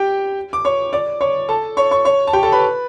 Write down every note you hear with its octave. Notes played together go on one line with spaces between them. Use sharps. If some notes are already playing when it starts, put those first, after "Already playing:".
Already playing: G4 G5
D6
C#5 C#6
D5 D6
C#5 C#6
A4 A5
C#5 C#6
C#5 C#6
C#5 C#6
A5
G4 G5
A4 A5
B4 B5